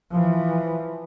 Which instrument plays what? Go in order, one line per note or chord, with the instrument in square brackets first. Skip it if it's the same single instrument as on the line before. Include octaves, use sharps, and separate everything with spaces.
[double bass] E3 F3